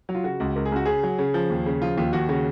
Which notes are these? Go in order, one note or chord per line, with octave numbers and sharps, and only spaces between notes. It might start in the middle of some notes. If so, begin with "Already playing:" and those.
F#3
F4
C#3 F#4
C#2
C#2 A#4
G#4
C#2 F#4
C#3 G#4
F#3
C#3
F3
D#2
C#3
F3 F4
D#2 F4
D#2 F#4
C#3 F#4